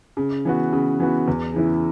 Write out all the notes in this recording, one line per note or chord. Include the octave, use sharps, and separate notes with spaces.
C#3
E3 B3 F#4
C#3
E3 B3 F#4
E2
C#3 E3 B3 E4